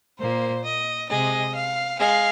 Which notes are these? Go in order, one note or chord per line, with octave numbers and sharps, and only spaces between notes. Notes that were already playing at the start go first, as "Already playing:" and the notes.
A#2 A#3 C5
D#5
C3 G#3 D#5
F5
G#3 F5